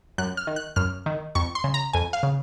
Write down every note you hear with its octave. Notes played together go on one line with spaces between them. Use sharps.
F#2 F#6
F6
D#3
F#6
F#2 F6
D#3
F2 C#6
C6
C#3
A#5
F2 G#5
F5
C#3